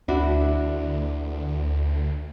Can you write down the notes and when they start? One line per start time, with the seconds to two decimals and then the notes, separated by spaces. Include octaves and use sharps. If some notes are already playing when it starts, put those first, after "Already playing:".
0.08 D2 D4 E4 F#4